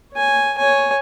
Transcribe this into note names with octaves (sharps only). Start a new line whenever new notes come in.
C#5 G#5
C#5 G#5